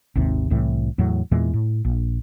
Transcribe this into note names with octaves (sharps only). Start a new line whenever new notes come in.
G#1 D#2 C3
C2 A2 E3
E2 A2 F#3
E2 A#2 E3 G#3
A2
A#1